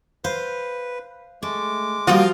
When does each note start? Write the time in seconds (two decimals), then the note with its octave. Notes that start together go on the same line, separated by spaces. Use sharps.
0.25 B4 C5 F5
1.43 G#3 A3 D6
2.07 F3 G3 A#3 F4 F#4 D#5